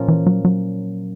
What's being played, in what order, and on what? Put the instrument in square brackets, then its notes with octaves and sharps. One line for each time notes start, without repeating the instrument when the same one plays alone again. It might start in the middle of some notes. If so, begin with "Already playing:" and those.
Already playing: [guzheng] A#2 F3 C#4
[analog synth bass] E3
F#3
F#3